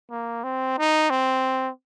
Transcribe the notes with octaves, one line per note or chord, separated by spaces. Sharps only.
A#3
C4
D#4
C4